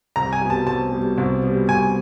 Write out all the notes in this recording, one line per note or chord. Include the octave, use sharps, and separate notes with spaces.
C2 A#5
G#5
B2 G3
A5
C2 A5
B2 G3
C2
B2 G3
C2 G#5